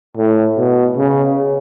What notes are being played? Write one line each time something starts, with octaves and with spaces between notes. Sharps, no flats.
A2
B2
C#3